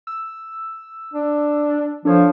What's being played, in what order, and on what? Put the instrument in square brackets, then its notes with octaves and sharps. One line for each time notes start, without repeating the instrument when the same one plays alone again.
[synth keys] E6
[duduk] D4
[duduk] F3 [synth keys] D4 A4 C#5